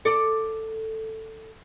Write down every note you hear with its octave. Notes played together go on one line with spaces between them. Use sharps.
A4 D5